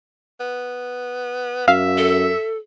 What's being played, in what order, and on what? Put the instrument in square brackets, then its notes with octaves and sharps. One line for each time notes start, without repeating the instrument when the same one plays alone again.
[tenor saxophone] B3
[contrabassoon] F#2 [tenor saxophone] E5 [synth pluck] F5
[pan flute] A4